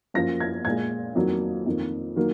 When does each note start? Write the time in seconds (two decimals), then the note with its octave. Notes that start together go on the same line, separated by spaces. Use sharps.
0.14 F#2 F3 A#3 A#6
0.40 G#6
0.65 A#2 G#3 G#6
1.15 F2 D#3 F#3 A#3
1.66 F2 D#3 A#3
2.16 D#3 F#3 A#3